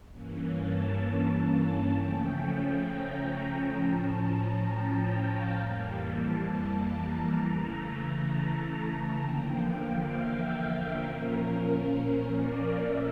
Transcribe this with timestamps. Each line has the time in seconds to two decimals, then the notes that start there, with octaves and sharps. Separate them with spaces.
0.11 G2 E3 A#3 C#4
0.55 A5
1.92 C#3 F3 A3 C#4 G5
2.82 A#5
3.72 A2 F3 C#4 A5
4.17 A#5
4.62 G5
5.07 F5
5.53 F2 E3 G3 A#3
5.98 A5
6.44 A5
6.88 A#5
7.34 C#3 E3 A3 A#5
7.80 A#5
8.24 A5
9.15 E2 D3 F3 A#3 G5
9.60 F5
10.05 E5
10.50 F5
10.95 A#2 F3 A#3 C#4 A#4
12.30 D5
12.76 A#2 A3 C#4 E5